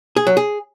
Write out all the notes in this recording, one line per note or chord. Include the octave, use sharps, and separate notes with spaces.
G#4
F#3
G#4